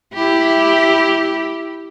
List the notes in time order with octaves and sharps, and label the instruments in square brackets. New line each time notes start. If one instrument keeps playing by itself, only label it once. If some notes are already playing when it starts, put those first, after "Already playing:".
[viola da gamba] E4 G4